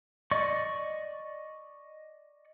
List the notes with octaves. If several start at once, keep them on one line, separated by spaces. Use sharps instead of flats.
D5 D#5 C#6